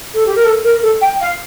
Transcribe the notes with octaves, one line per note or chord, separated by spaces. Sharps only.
A4
G4
A#4
A4
A#4
A4
G5
F5